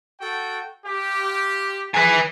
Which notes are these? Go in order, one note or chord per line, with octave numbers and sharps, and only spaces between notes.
F#4 A4 G5
F4 G4
G#4 B4 G#5